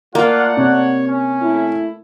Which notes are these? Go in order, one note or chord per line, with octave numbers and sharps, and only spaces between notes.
A3 A#3 F4 D5 F#5
C3 C#5
C#4
A3 E4